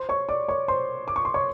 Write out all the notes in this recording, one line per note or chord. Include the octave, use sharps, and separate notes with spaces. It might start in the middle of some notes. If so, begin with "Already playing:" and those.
Already playing: C5 C6
C#5 C#6
D5 D6
C#5 C#6
C5 C6
D6
C#6
C6
C#5 C#6